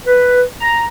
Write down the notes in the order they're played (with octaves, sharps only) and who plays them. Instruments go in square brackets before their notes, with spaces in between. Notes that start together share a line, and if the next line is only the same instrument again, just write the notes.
[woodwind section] B4
A#5